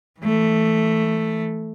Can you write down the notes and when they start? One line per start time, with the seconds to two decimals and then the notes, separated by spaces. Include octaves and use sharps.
0.20 E3 A3